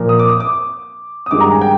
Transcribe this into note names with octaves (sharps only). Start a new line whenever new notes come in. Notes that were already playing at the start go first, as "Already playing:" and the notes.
Already playing: A#2 F3 A#3
D#6
D6
D#6
D6
D#6
G2 D#3 G#3 D6
A#5
G#5
G5